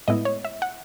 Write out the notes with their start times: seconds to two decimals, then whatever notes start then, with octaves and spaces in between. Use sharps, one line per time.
0.08 A2 G#3 B3 E4 D#5
0.25 C#5
0.45 E5
0.62 F#5